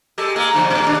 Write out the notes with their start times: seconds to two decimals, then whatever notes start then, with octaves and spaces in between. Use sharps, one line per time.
0.18 G#3 G4 A4
0.36 G#3 A#3
0.53 G#2 D3 F3
0.70 B2 A3
0.85 D#2 D4